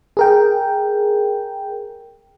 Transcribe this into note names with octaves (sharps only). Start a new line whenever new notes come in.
G#4 A#4 G5